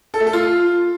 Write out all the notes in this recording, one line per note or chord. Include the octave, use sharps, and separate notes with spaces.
A4
A3
A4
F4